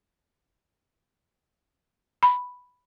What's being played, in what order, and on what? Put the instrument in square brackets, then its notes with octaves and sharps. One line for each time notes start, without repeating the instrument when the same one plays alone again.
[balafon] B5